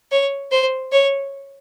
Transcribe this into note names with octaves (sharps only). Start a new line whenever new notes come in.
C#5
C5
C#5